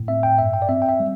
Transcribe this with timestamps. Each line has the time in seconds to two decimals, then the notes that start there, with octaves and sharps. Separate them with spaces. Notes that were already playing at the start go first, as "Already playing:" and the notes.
Already playing: A2
0.08 C4 E5
0.23 G5
0.38 G2 E5
0.54 G5
0.62 D5
0.69 C4 E5
0.82 G5
0.89 E5
1.00 G3